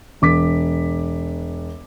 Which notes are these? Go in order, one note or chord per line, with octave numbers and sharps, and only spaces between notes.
E1 D6 B6